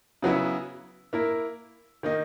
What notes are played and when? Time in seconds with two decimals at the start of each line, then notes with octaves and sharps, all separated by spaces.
0.23 C#3 F#3 B3 E4 B4
1.13 A#3 E4 A#4
2.03 D#3 A#3 D#4